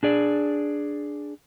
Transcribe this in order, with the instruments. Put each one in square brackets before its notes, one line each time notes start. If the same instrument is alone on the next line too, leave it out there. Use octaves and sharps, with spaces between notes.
[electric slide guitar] D4 G#4 D5